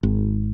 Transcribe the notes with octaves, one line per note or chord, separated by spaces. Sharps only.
G#1